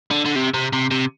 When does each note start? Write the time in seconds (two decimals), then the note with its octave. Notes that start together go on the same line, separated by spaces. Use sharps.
0.11 D3
0.26 D3
0.36 C3
0.54 C3
0.73 C3
0.91 C3